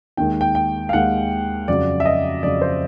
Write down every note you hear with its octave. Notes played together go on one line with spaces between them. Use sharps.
D#2 D#3 G#3 G5
G5
G5
F5
D#2 D#3 G#3 F#5
F2 C#3 F#3 D5
E5
D#5
F2 C#3 F#3 D5
C5